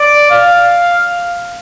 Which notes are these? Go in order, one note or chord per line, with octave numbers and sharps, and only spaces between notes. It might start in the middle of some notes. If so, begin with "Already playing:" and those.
Already playing: D5
F5